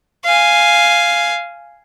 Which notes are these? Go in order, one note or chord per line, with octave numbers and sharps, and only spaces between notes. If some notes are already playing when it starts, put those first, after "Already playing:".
F5 G#5